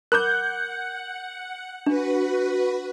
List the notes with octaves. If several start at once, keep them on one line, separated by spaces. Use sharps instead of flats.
A#4 F#5 B5 D6 F#6 G6
D4 F#4 B4